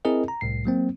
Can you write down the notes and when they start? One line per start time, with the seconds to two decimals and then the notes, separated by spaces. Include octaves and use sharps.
0.05 C4 E4 G#4 A#4 D#5
0.28 A#5
0.41 C2 A2 C7
0.65 F#3 A#3 C4